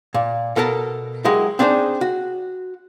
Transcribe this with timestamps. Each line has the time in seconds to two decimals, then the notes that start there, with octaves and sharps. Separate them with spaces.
0.14 A#2
0.56 B2 A4 A#4 A5 A#5
1.25 F#3 G#3 E4 G4 A#4
1.59 C4 D4 D#4 G#4 C5
2.01 F#4